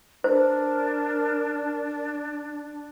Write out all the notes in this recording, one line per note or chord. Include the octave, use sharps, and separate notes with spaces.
D4 A#4 C5